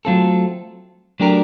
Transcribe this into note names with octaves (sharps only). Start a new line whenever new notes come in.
F#3 A3 C4 F4 A4
F#3 A3 D4 G4 A#4